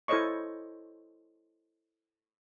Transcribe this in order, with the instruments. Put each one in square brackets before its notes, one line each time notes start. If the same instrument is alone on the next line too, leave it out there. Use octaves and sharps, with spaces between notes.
[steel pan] E4 A4 C5 C#5 D#5 C#6